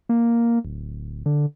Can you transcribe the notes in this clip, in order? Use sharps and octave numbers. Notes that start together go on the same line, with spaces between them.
A#3
D1
D3